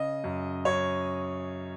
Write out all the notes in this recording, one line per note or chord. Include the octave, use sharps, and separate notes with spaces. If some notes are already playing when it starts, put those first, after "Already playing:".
Already playing: C#3 D#5
F#2
F#2 C#5